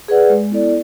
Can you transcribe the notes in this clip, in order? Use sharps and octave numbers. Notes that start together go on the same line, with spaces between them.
G#4 B4 D5 F#5
G#3
B3 E4 A4 D5